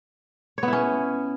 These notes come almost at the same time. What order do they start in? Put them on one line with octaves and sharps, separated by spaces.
C#5 B3 E4 C#4